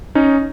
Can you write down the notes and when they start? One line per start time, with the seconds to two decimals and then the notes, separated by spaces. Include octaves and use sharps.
0.15 C#4 D#4